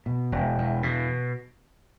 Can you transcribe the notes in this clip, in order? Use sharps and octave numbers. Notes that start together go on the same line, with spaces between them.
B2
E1
E2
B2